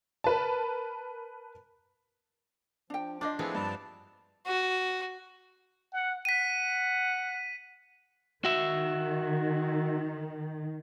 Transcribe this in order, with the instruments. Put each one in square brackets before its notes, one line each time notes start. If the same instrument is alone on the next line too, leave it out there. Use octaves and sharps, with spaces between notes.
[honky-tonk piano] A#4 B4 A5
[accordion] F3 [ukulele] D4 G5
[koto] D4 [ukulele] F4 C5 D#5 [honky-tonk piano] D6
[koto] F3 B3 C4 [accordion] A3 E4 G#4
[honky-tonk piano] G2 [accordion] D5 A5
[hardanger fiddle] F#4
[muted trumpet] F#5
[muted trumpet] F#5 [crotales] B6 D#7
[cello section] D#3 [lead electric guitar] F#4 E5